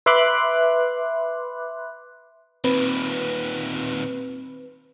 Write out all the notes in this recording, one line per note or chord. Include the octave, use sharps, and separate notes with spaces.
B4 E5 B5 C6 D6 F#6
D#2 A#2 C4 B4